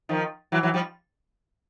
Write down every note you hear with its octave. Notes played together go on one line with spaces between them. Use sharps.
D#3 F3
E3 F#3
E3 F#3
F3 G3